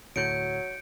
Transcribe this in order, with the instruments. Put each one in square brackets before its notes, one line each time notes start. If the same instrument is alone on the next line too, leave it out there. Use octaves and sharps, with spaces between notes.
[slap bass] D2 A2 [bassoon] F#3 [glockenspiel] G6 C#7 D7